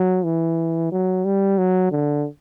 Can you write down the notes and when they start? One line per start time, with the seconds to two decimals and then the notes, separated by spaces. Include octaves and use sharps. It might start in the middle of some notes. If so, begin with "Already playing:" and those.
Already playing: F#3
0.24 E3
0.92 F#3
1.24 G3
1.58 F#3
1.91 D3